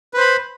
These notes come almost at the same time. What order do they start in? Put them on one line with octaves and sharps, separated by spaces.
B4 C5 B5